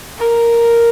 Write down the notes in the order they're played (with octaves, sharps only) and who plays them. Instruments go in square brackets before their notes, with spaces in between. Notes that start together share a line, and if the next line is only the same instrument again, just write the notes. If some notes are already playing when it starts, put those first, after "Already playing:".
[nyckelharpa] A#4